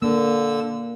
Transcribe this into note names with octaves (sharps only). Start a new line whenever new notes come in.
D3 A#3 E6